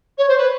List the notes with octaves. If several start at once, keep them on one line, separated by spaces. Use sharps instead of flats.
C#5
C5
B4